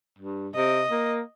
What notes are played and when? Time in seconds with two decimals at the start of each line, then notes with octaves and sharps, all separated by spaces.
0.19 G2
0.55 C3 D#5
0.91 A#3